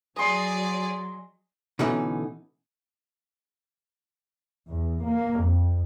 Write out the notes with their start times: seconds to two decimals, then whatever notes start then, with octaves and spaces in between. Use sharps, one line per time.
0.16 F#3 G#4 D5 D#5 C6
1.79 B2 D3 E3 A3 C#4 D#4
4.70 E2
5.06 A#3
5.42 F2